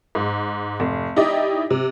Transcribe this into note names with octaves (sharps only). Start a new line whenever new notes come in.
G#2
F1
D#4 E4 G4 D5 D#5
C3